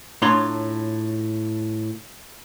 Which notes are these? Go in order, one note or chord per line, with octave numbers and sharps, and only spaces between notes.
A2 D4 F4 C#5 A#5 C6